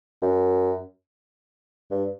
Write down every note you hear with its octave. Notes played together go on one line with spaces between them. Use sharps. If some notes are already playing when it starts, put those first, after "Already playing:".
F#2
G2